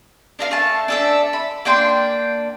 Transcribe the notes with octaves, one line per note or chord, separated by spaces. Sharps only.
D4 A#4 F5
A3 A5
D4 A4 E5
B5
A#3 D4 G5 C6